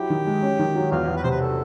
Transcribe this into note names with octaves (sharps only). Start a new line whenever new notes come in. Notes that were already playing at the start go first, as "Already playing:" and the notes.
Already playing: F#3 E4 G4
D#3
G#3
C#4
D#3
F#3
E2 F4
E2
B4
C3 C5
B4
A4